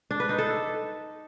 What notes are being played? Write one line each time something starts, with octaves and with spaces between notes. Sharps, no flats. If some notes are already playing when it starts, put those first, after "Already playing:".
D4
B4
D#4
A4